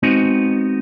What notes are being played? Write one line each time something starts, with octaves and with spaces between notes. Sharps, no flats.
G#3 B3 C4 D#4 F#4